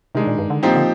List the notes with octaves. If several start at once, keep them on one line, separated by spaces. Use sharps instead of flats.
C3 D#3 G#3 D4
A#2
G2
D3
A#2 F3 C4 D#4 G4
D3